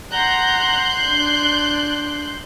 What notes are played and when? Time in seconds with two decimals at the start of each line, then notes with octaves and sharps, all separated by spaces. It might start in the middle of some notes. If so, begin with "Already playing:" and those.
0.12 F#5 A#5 C6 F#6 G6
1.09 D4